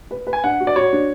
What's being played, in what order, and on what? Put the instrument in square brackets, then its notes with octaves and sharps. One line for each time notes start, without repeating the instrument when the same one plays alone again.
[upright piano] B4
B4
[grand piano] G#5
[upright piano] D4 [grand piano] F#5
[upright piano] F#4
[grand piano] D5
[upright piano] F#4 [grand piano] C#5
[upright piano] D4